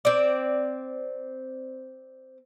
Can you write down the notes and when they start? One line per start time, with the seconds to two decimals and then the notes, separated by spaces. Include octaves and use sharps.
0.05 C4 D5